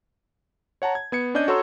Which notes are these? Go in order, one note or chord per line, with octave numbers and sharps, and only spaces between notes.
C#5 F#5 A5 A#5
G#6
B3 G#6 C#7
C#4 D4 D5 D#5 G6 D#7
F#4 A4 C#5 A#5 C6 E6